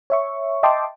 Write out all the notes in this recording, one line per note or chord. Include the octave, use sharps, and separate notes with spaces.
C#5 E5 C#6
D#5 E5 G5 A5 C6 D6